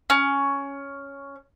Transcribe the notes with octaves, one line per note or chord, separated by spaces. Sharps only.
C#4